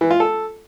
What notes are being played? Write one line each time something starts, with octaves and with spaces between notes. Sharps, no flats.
E3
F4
A4